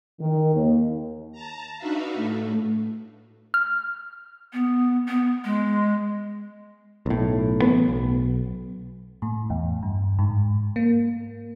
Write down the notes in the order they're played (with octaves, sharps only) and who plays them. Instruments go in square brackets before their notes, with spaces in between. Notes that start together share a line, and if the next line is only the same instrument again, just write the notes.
[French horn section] D#3
D#2
[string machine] A5 A#5
D4 D#4 F#4 B4 E5 F5
A2 A3
[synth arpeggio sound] F6
[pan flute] B3
B3
G#3
[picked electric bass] B1 A2
A1 B3
B1
[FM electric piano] A2
E2
G2
G#2
A#3